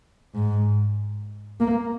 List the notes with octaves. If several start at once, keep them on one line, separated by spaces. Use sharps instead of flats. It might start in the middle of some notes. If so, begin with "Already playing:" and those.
G#2
A#3